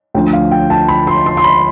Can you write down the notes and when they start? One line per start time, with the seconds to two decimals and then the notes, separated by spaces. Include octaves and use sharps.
0.14 D2 D3 F3 G5
0.33 F5
0.52 G5
0.70 A5
0.88 B5
1.07 C6
1.26 C6
1.37 C6
1.44 B5